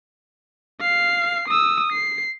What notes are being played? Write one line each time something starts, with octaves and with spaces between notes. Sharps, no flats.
F5 C7
D#6 E6
C7